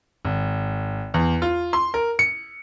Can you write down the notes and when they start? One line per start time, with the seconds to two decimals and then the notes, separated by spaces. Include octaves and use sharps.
0.25 G#1
1.14 E2
1.42 F4
1.73 C6
1.94 A#4
2.19 C#7